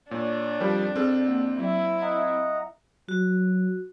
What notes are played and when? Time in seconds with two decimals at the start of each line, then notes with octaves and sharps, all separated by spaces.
0.11 A#2 D4 C#5
0.60 F2 F3 G3 A#4 G5
0.96 C4 G#4 A4
1.28 A#3
1.58 F#3 E4
2.02 D#5 F#5 A#5
3.09 F#3 F#4